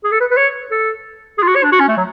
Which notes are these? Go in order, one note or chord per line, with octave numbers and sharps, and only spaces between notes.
G#4
A4
B4
B4
C#5
A4
G#4
F4
F#4
C#5
D4
F#4
C#4
A3
F#3